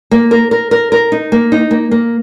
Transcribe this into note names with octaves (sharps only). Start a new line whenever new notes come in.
A#3
A#4
A#4
A#4
A#4
D#4
A#3
D#4
A#3
A#3